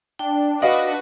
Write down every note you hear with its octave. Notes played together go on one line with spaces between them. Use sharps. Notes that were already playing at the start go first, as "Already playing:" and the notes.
D4 G5
F#4 B4 D5 D#5 F5 F#5 D#6